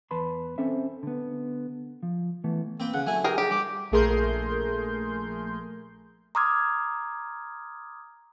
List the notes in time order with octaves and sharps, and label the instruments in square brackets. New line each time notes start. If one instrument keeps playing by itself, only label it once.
[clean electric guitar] E2 B4 A5 B5 C6
C4 C#4 A4 C5 E5
D3 B3
F3
E3 A3 B3
[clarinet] A#3 [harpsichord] C4 B4 G5
[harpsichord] C#3 [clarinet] F#5
[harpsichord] F#3 A3 E4 [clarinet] G#5
[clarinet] G4 [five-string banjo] G#4 A#4 G5
[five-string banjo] G4 [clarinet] G#4
[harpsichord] G3 [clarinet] D6
[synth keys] A#1 A3 G#4 A#4 C6 G6
[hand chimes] A#5 C6 D6 D#6 F6 G#6